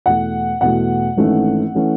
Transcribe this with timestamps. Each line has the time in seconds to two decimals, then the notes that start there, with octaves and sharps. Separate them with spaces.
0.06 E2 B2 A3 F#5
0.61 E2 B2 A3 F#5
1.17 G#1 G#2 E3 A3 C#4
1.75 E3 A3 C#4